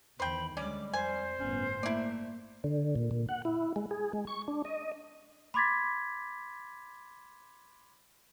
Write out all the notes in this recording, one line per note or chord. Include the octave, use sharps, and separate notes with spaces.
E2 D#3 C5 G5 B5
D2 G3 G#3 C#4 D6
F2 C5 G#5
G1 A2 B3 C#4
A3 A#3 E4 D5
D3
A#2
A#2
F#5
E4
G#3
G#4
G#3
C#6
D4
D#5
B5 C6 D6 G#6 A6 B6